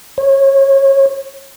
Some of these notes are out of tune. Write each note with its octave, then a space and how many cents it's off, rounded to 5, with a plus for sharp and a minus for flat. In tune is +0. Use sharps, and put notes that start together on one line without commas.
C#5 -25